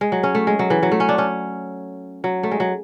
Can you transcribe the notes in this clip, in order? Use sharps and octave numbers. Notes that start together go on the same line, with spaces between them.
G#3
F#3
C#4
A3
G#3
F#3
E3
F#3
A3
C#4
D4
C#4
F#3
A3
G#3
F#3